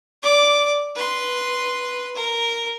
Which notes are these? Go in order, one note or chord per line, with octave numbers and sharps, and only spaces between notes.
D5 D6
B4 C6
A#4